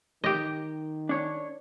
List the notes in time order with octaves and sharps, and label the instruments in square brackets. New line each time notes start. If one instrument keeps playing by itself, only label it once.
[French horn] D#3 [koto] G4 D#5
[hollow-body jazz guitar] D4 C#5